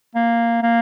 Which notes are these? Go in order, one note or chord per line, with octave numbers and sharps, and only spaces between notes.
A#3
A#3